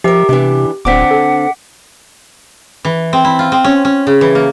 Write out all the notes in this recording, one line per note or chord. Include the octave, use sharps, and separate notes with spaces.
F3 G4 A#4 E5
C3 E3 B3 D4
D1 D3 C4 D4 F#5 D6 B6
A4
E3
C4
E4
F4
C4
C#4
C#4
C#3
E3
A#3